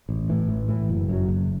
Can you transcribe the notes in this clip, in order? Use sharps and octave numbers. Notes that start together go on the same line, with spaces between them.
A1
A2 E3
A1
A2 E3
F#1
F#2 F#3
F#1